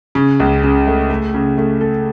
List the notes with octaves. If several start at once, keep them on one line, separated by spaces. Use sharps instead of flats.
C#3
C#2
C#3
A3
A3
C#3
A3
A4